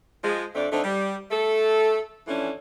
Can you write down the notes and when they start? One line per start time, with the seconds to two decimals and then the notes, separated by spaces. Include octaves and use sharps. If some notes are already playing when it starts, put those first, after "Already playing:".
0.23 F3 G#3
0.55 F2 A3 C4 D4 D5
0.72 D3 A3 C4 D4 D#4
0.84 G3
1.31 A3 A4
2.27 E3 F3 A3 C#4 D4